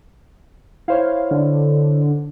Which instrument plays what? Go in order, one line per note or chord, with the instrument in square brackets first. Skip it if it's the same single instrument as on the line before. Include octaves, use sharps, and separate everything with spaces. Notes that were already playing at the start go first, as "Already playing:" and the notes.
[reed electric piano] E4 C5 C#5 [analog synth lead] F5
[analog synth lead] D3